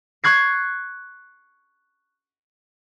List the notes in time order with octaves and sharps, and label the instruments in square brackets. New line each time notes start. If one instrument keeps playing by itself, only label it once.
[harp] C#6 F#6 G#6 C7